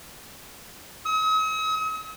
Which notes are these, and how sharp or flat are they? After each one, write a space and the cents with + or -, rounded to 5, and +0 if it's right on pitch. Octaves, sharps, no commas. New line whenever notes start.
D#6 +45